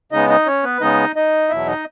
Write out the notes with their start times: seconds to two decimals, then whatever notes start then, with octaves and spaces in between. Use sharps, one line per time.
0.12 C#3 G#3 B3 D#4 D#5
0.30 D#4 D#5
0.47 C#4 C#5
0.64 B3 B4
0.81 C#3 G#3 B3 D#4 D#5
1.16 D#4 D#5
1.49 E2 B2 F#3 E4 E5
1.67 D#4 D#5